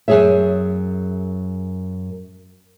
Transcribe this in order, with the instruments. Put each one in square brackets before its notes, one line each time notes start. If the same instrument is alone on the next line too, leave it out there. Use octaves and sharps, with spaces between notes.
[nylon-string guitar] F#2 C#3 G#4 C#5 E5